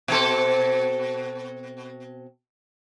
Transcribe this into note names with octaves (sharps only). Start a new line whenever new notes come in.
B2 C4 A4